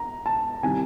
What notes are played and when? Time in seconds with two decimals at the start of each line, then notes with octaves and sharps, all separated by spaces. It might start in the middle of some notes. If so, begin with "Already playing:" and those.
Already playing: A#5
0.26 A5
0.62 C3 D#3 G3 C4 E4 G#5